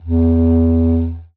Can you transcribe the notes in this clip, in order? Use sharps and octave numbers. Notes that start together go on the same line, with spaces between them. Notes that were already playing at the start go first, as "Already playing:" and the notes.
E2